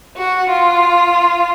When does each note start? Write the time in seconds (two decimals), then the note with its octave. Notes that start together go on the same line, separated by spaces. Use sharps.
0.17 F#4
0.48 F4